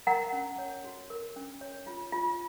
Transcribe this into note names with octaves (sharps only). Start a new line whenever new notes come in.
A#4 F#5 A#5
C#4
C#5
F#4
A#4
C#4
C#5
F4
F4